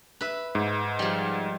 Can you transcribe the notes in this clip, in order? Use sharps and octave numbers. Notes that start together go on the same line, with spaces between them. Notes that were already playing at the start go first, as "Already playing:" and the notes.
B4 E5
G#2
F3 G3